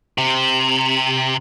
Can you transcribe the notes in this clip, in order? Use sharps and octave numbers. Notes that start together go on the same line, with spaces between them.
C3